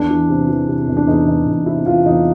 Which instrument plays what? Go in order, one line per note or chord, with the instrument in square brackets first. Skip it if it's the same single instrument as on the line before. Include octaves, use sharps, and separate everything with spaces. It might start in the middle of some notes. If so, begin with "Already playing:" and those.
Already playing: [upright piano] E2 D4
E3
C3
E3
C3
E2
D4
E2 D#4
E2
E2
C3 E4
E2 F4
E2 D#4